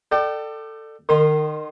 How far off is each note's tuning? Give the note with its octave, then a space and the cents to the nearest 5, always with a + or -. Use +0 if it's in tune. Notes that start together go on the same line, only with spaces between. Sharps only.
A4 +15 D5 +30 G5 -25
D#3 -30 A#4 +0 C6 +0